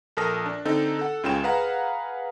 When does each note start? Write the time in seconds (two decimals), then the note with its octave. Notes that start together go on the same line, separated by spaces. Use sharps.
0.17 A#1 A4 A#4 A5 D#6 A#6
0.46 D4
0.65 D3 C4 D#4 A4
0.99 A4 F#5
1.23 C#2 C#3 F4 G5 E7
1.43 G#4 B4 F5 F#5 A#5